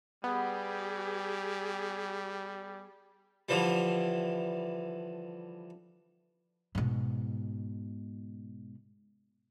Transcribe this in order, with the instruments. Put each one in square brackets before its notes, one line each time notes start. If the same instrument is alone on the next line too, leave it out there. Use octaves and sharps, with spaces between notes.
[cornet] G3 [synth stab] B3 [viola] G4 G#4
[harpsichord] D3 E3 F3 G3
[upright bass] G#2 B2